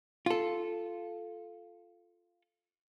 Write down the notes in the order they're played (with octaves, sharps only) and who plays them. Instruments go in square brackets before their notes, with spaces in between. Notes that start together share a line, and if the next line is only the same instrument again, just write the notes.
[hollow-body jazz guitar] F4 A4